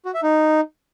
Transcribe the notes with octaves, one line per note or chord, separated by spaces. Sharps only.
F#4
E5
D#4